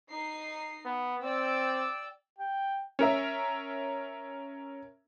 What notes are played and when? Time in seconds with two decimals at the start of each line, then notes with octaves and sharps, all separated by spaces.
0.10 D#4 C7
0.86 B3
1.22 C4 D5 G5 E6
2.39 G5
2.99 C#4 A#4 E5